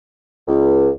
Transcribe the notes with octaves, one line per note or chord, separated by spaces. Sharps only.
C#2